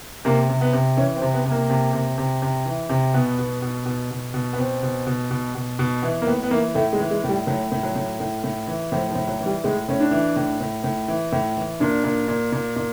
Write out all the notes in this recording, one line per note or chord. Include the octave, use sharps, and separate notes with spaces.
C3 A#3
C3
B3
C3
E3 C#4
C4
C3
B3
C3
A#3
C3
C3
C3
C3
E3
C3
B2 B3
B2
B2
B2
B2
B2
B3
B2 C4
B2
B2
B2
B2
B2
E3 B3
A#3
A2 B3
B3
E3 A#3
A2 A3
G#3
E3
G#3
A2
G3
A2 F#3
A2
F#3
A2
A2
A2
E3
A2 F3
F3
A2
F#3
E3
G3
A2 G#3
A2 C#4
D4
E3
A2
A2
A2
E3
A2
E3
A#2 D4
A#2
A#2
A#2
A#2